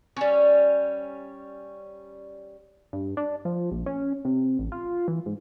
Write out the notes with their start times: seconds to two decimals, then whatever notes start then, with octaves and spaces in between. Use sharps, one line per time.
0.17 G3 C#4
2.93 G2
3.17 D4
3.45 F3
3.71 A#1
3.86 C#4
4.25 C3
4.59 A1
4.72 F4
5.08 E3
5.26 G#2